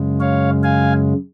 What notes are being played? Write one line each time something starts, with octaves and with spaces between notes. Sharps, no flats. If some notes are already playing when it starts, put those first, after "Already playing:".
Already playing: F#2 C#3 G#3
C#5 F5
F5 G#5